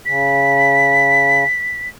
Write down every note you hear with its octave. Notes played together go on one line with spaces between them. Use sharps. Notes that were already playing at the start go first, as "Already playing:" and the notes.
C#3 B6